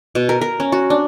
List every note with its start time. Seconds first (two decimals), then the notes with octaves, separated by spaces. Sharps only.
0.15 B2
0.29 A#4
0.41 A#4
0.60 C#4
0.72 F#4
0.90 D4